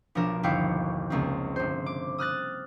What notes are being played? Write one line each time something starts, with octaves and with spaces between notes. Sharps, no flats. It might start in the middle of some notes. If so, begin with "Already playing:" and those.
B1 F3 D4 A#4 E7
G1 D#2 E4 F5 G5 C#6
F1 C#2 A#3 C4
G1 C5
D6
D#6 F6 F#6 A6